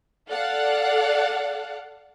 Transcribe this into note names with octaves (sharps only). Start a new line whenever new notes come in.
A4 D5 F5 F#5